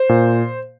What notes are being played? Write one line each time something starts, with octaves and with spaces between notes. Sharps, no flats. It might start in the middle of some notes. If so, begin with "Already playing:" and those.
Already playing: C5
A#2